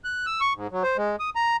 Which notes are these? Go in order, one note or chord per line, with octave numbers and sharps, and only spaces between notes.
F#6
E6
C#6
G#2
F#3
C5
G#3
D#6
A#5